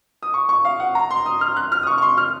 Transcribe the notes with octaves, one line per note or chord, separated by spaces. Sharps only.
D#6
C#6
C#6
F5
F#5
A#5
C6
D#6
F6
F#6
F6
D#6
C#6
C#6
C6
F6